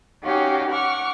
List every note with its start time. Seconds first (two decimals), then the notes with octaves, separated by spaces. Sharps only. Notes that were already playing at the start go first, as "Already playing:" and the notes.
0.23 C#4 D#4 F#4 G4 F5 G5
0.71 F#5 C#6 D6 F6